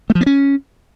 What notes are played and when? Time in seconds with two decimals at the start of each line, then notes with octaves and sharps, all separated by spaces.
0.10 A3
0.15 F3
0.21 B3
0.26 C#4